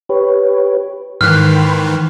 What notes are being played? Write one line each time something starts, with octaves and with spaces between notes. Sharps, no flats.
G4 B4 C#5
G#2 D#3 E3 G5 B5 C6 F6 F#6